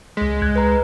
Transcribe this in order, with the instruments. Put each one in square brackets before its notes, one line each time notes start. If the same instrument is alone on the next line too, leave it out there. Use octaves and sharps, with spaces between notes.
[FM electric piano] C#2 B6 [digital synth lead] G#3
[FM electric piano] C#2 F#6 G#6
[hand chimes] B4 A#5